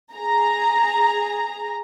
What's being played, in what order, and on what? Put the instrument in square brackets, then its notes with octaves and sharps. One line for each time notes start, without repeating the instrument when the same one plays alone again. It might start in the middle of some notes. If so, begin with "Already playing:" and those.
[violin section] G#4 A#5